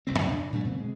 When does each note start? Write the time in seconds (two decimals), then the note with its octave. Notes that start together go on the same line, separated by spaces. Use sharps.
0.07 F1 C2 A#2 C4
0.19 F2 C#3
0.30 D4
0.52 A#2 F#3 G3 A3
0.65 B2 D3 C4
0.80 G#3